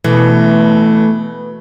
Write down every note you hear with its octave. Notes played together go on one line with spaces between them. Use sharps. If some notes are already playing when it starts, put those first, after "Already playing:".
B2 E3 A3